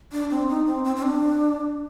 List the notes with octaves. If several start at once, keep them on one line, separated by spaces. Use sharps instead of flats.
D4
C4
D#4
C4
C4
C4
D4